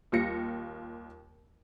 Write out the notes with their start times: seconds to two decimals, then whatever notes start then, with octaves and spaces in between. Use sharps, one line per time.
0.12 D#2 G3 F4 A#6 C#7